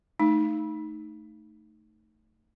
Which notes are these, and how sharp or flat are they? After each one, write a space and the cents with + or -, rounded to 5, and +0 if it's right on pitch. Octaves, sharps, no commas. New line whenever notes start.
A3 +0 D#4 +0